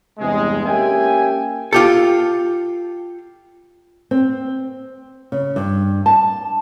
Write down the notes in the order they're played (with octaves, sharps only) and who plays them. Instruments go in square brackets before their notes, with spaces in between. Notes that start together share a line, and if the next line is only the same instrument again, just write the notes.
[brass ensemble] E2 G2 C3 G#3
A#3 C#4 G4 E5 G5 G#5
[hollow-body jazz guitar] F4 G4 A4
[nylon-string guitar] C4
C#3
G2
A5